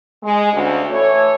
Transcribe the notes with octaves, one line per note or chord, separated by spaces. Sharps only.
G#3
D2 C#3
E3 A3 A4 C#5